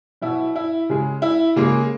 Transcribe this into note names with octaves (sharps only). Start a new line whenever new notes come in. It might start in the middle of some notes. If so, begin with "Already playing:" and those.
B2 F#3 E4
E4
C#3 G#3
E4
C#3 G#3 A#3